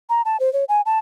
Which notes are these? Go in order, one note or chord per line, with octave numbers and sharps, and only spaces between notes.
A#5
A5
C5
C#5
G#5
A5